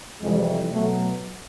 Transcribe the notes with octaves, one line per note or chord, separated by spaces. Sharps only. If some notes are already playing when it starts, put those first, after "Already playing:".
F2 C3 E3 G3 G#3
B2 F#3 A3